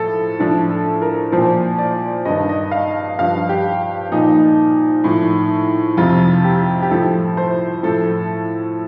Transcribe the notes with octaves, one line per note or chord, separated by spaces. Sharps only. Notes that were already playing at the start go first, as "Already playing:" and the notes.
Already playing: A2 F3 A4
A2 F3 D4
A4
A#4
A#2 F3 C5
D5
G2 D#3 D#5
D#5
F5
G2 F3 F5
G4
A#2 F3 D#4
A2 F3
F2 C3 F3 F4
G4
G4
A2 F3 A4
C5
A2 F3 A4